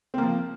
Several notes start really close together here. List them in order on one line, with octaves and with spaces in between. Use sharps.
C4 A#3 F3